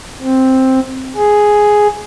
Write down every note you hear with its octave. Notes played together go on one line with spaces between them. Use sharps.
C4
G#4